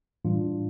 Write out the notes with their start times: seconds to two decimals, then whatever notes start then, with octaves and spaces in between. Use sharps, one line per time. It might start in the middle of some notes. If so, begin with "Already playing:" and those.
0.25 A2 E3 G3 D4 F4